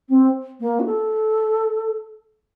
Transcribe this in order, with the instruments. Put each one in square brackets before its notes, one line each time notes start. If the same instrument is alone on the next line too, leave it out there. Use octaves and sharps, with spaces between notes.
[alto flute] C4
A#3
F#4
A4